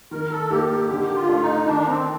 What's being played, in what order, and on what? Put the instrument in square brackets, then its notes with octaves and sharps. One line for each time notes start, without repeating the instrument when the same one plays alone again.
[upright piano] D#3 [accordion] A#4
[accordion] A4
[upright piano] A#3 D#4 [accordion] G4
[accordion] G4
[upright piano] D3 [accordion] G4
[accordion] F4
[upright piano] A3 D4
[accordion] D#4
[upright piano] D#3 [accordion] D4
[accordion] C4